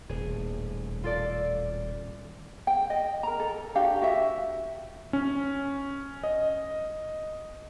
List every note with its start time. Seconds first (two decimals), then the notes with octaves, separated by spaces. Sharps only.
0.09 D#1 A2 G#4
1.04 F4 A4 D5
2.67 G5
2.90 D#5
3.23 A#4 A#5
3.40 A4
3.75 D4 F#4 G4 F5
4.02 F#4 E5
5.13 C#4
6.24 D#5